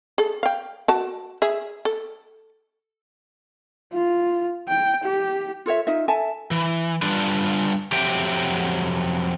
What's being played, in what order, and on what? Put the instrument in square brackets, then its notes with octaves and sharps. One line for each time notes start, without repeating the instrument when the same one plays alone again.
[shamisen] G#4 A4
F5 G5
F#4 A5
G#4 E5
A4
[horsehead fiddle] F4
G5
G4
[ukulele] F4 A4 C#5 E5
D#4 F4 E5
A4 E5 G#5 A5
[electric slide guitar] E3
G3 D4 F4 B4 D5
F2 F#3 G4 E5 G5